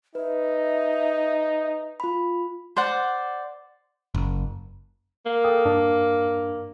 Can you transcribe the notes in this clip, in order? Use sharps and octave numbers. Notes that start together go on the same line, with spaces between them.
D#4 B4 E5
F4 B5
C5 D5 F#5
F#1
A#3
A4 G5 D#6
G2 D4